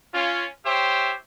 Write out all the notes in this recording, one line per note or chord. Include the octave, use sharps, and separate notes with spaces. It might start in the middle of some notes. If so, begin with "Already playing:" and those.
C#4 F4
G4 C5 C#5 E5 G5